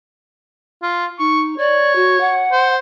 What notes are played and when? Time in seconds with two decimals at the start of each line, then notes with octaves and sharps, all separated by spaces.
0.82 F4
1.19 D#4 C#6
1.58 C#5 D5
1.95 F#4
2.20 F#5
2.52 C5